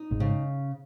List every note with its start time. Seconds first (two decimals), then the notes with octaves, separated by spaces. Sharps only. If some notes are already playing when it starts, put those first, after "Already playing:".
Already playing: D#4
0.11 G#1 G#2
0.20 C#3